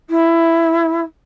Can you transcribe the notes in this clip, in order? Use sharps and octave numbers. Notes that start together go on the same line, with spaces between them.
E4